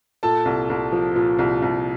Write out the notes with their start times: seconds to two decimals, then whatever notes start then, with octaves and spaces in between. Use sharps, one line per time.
0.23 A#2 A4 A5
0.45 C2
0.70 C2
0.92 F3
1.16 A#2
1.38 C2
1.62 C2